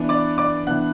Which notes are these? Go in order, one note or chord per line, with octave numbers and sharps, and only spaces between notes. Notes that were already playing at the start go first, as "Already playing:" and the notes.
Already playing: E3 B3 D4
D5 D6
D5 D6
E3 B3 D4 F#5 F#6